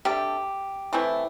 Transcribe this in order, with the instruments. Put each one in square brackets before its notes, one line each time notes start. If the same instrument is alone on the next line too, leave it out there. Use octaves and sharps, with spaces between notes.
[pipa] C3 G3 D4 A4 [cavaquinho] G4
[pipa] E3 A3 C4 E4